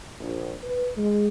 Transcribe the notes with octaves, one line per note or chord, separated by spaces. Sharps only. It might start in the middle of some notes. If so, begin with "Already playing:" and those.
A#1
B4
G#3